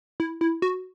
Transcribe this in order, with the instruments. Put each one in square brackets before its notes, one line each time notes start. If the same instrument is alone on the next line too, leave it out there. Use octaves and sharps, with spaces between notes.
[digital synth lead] E4
E4
F#4